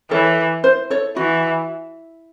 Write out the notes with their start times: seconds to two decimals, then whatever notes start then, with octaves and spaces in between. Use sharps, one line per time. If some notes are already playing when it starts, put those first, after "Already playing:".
0.11 E3 A4 C#5
0.64 C5
0.90 A4 C#5
1.16 E3 F#4